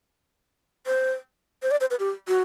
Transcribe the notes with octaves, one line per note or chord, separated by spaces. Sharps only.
C5
C5
D5
C5
B4
G4
F#4